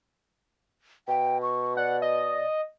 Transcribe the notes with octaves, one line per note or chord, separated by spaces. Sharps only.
B2 G5
C#6
D5 F#5
D#5